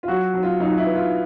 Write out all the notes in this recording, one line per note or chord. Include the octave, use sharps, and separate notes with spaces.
F4
F#3 F#4
F#3
F4
F#3 D#4
E4
B3
F4